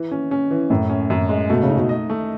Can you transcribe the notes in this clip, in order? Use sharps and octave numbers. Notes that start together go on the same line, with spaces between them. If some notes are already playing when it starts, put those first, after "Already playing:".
Already playing: E3
C#4
C#4
E3
F#2 A2
C#4
F#2
G#3
B2 A3
C#3
D#4
B2
D#5
A3